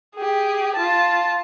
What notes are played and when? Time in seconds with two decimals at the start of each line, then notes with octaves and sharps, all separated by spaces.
0.16 G4 G#4
0.76 F4 A5